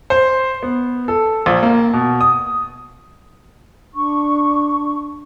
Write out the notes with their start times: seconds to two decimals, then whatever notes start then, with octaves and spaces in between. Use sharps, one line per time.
0.10 C5
0.63 B3
1.08 A4
1.46 A#1
1.63 A#3
1.93 B2
2.21 D#6
3.95 D4 C#6